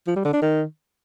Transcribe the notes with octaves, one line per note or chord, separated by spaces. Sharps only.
F3
G3
D3
D4
D#3